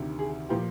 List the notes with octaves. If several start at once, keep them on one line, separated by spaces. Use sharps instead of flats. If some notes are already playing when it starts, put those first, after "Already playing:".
Already playing: D2 C3 D#3
G#4
A#2 F3 G4